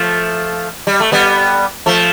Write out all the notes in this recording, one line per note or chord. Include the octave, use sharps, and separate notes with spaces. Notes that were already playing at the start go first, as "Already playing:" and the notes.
Already playing: F3 A3
G3
A3
G3 B3
F3 A3